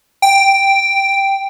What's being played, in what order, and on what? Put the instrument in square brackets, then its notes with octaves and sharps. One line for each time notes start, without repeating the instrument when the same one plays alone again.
[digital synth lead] G5